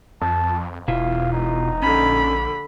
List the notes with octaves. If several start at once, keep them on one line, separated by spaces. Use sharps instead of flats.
F2 A5
E1 B2 E4 F4 F5
D#4
A#1 D3 C#4 B5